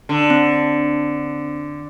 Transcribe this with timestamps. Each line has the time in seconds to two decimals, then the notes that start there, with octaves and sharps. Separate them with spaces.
0.09 D3
0.30 C4